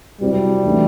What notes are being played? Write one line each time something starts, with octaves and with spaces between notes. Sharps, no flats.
C3 F#3 G3 C4 E4
E3 A3 D4 F#4